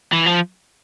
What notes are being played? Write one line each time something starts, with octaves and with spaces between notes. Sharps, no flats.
E3
F3